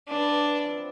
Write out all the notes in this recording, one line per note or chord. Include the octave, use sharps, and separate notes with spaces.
G2 E3 B3 D4
F3 C4 F4